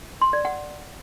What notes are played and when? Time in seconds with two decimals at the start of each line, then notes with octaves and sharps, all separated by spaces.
0.21 C6
0.33 D5
0.45 F#5